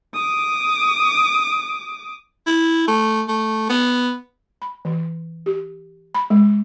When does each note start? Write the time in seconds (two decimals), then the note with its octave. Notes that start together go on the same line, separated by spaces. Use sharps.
0.14 D6 D#6
2.47 E4
2.88 A3
3.28 A3
3.69 B3
4.62 B5
4.85 E3
5.46 G4
6.15 B5
6.30 G#3